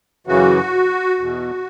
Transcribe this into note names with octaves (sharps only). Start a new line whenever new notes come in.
F#2 C#3 E3 F#4
E2 B2